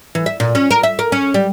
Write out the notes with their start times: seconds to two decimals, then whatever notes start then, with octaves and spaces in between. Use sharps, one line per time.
0.15 E3
0.26 E5
0.40 A#2
0.55 C#4
0.71 A#4
0.83 E5
0.99 A#4
1.12 C#4
1.34 G3